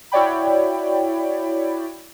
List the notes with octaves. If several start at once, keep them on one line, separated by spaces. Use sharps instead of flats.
E4 F#4 C#5 D5 G5 B5